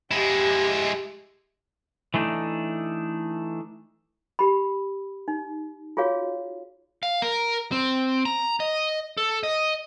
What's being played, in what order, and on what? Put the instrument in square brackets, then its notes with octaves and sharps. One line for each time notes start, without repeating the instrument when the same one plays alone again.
[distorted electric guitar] G#3 E4 [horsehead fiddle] G4
[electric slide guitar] E3 A3 D4 D#4
[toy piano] G4 B5
D#4
F4 F#4 G#4 C#5 F5
[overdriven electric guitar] F5
A#4
C4
A#5
D#5
A4
D#5